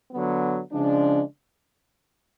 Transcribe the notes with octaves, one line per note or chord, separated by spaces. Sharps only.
D3 F#3 B3
C#3 F3 G#3 D4